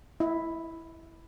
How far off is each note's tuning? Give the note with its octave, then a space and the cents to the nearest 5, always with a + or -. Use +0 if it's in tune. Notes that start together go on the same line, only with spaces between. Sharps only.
E4 +0 D#5 +35